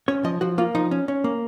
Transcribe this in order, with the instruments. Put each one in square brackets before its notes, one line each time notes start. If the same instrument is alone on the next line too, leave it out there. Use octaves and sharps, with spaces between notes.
[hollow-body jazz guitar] C#4 C#5
F3 D#5
F3 F#4
A#3 F4
F3 D#4
C#4
C#4
A#3